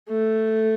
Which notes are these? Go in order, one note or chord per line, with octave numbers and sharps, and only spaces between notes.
A3